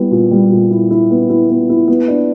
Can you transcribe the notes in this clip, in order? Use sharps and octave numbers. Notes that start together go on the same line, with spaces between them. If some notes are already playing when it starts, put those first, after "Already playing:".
Already playing: G3 B3 E4
A#2
G3
A#2
E4
E4
B3
E4
B3
E4
B3
D4